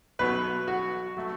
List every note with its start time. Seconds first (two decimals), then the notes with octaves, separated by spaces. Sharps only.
0.19 B1 B2 F#3 B4
0.68 F#4
1.17 F#3 A3